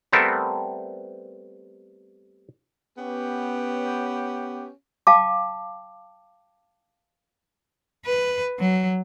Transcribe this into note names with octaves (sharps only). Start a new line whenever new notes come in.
G3 A3 B3 C4 A4 A#4
B3 C#4 G4
F5 G5 A5 D6
B4
F#3